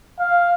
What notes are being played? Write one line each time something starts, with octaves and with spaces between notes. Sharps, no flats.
F5